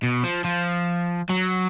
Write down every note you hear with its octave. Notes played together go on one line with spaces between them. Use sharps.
B2
F3
F3
F#3